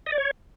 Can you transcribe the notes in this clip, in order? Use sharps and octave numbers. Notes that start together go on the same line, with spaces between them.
D#5
D5
C#5